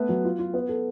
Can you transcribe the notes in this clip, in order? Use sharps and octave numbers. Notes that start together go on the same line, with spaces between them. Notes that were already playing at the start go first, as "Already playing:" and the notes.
Already playing: A3 B3
F#3
F4
F4
B3
A4